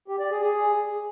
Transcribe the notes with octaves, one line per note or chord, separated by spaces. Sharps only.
G4
D5
G#4
G#4